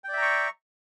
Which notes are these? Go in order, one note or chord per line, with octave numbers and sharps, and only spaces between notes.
D5 E5 G5 A#5 C#6